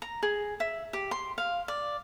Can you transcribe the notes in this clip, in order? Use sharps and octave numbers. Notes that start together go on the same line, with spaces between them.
A#5
G#4
E5
G4
C6
F5
D5